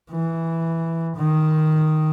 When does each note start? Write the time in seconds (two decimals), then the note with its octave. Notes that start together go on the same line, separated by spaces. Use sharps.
0.11 E3
1.17 D#3